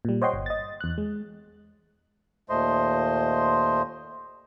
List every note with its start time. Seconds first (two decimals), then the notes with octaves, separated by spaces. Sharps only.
0.05 A#2 G3
0.22 C5 C#5 D#5 F#5 G5 C6
0.34 G1
0.46 D#5 A6
0.81 E2 F#6
0.98 G#3
2.50 D#2 A#2 A3 C5 D#5 C6